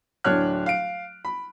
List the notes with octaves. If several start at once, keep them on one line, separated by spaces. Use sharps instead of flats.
D1 D4 C#5 F6 F#6
F5 D7
B5